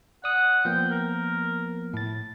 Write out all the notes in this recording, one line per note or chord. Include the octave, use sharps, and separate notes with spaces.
D5 F#5 D#6
F3 A#3 B3 G5
A#4
A2 A6